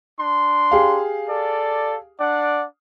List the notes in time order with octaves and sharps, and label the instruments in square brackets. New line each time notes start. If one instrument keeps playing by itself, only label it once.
[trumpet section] D4 C6
[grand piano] G4 G#4 F5
[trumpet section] A4 D5
D4 D5 F#5